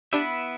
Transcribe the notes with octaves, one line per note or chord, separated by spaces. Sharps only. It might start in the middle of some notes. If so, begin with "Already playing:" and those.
B3 D4 E4 G4 B4 E5